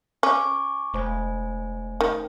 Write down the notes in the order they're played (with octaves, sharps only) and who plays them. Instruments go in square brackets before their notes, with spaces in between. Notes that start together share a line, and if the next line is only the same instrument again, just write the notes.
[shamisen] C#4 [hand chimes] G#5 C#6 D6
[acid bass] E1 [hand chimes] A3 C5 G#5
[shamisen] D#3